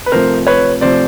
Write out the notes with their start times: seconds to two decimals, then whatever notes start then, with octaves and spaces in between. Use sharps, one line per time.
0.06 B4
0.12 C3 F3 A3 A#4 C5
0.47 B4 C#5
0.81 C3 F3 A3 C5 D5